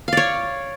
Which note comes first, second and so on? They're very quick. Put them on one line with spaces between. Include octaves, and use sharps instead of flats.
F5 D5 C#5